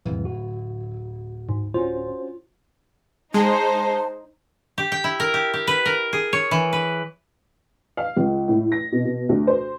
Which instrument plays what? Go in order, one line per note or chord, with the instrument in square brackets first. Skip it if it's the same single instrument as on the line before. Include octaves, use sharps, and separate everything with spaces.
[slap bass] D1 [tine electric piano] C2 F2 E3
[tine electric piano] F#4
[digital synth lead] G#2
[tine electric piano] C#4 F#4 C5 [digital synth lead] F4
[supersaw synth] G#3 [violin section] D#4 C5 [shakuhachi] A5
[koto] G4
G5
E4
A#4
G4
G4
B4
A#4
G#4
C#5
E3
B4
[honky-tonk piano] F5
C#2
A2
A#6
B2
B2
D2
C5